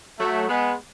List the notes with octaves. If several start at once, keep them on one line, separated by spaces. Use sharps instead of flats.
F#3 A3
G#3 B3